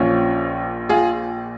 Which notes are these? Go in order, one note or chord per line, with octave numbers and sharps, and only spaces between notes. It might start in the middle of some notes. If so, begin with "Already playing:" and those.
Already playing: A#1 A#2 F3 C#4 F4
F4 G#4